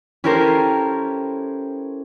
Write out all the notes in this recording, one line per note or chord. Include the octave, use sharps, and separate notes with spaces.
C#4 E4 G4 A4 A#4 C5